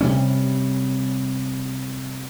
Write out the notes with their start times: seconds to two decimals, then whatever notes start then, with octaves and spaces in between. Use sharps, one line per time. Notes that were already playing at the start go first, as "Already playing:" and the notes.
0.01 C3 G3 C#4